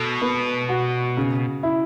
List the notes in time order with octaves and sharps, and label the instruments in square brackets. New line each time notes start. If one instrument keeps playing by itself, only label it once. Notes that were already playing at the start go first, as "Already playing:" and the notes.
Already playing: [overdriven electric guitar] B2 [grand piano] A4
[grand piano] B3
F#4
C#3
E4